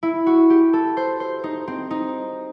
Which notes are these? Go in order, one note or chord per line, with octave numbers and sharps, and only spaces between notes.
E4
F#4
G4
A4
C5
C5
D#4
C4
D#4